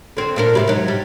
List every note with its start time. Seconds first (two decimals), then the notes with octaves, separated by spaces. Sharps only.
0.17 D3 C4
0.36 A#2 D4 A#4
0.55 A2 C3 G3
0.67 G#2 F#3
0.88 G3